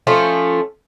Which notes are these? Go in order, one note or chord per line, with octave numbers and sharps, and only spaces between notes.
F3 A3 C#4 F4